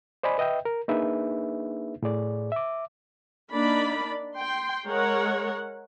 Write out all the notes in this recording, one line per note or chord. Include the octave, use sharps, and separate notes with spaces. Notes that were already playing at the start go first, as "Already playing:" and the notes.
C5 D5 D#5 G#5 B5
B4 D#5 E5 G5
A#4
A#3 D4 D#4 G#4 B4 E5
A2 G#4 D5
E5 D6
A#3 D4 D#4 D5 B5
G5 C6
G#3 A#4 C#5 F#5